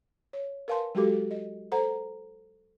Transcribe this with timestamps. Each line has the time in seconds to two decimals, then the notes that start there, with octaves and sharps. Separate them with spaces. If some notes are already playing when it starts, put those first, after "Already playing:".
0.33 C#5
0.68 A#4 B4 F5 G#5 A5 C6
0.95 F#3 G#3 F#4 G4 A4 D6
1.31 D#5
1.72 A4 C5 F#5 A#5